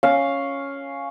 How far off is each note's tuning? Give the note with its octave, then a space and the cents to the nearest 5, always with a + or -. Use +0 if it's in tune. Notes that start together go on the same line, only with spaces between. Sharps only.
C#4 +0 F5 +0